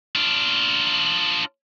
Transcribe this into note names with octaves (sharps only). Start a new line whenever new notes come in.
D4 F4